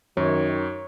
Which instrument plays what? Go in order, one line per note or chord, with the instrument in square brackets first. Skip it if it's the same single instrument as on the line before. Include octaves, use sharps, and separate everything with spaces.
[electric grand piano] F#2 [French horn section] D#3 [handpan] C#5